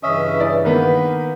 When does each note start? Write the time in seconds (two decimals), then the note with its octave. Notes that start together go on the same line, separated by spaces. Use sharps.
0.03 G2 C#3 E3 C#4 D#5 E5
0.38 E4 D5
0.65 D#3 A#3 B3 B4